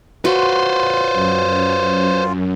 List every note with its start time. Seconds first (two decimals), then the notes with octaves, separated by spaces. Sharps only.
0.25 F4 F#4 B4 C5
1.13 F#2